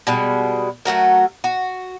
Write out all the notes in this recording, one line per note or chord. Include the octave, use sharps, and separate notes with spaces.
B2 G3 G#3
F#3 A3 F#4 A#4
F#4